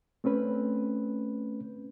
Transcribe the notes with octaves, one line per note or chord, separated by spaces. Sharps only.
A3 C4 C#4 B4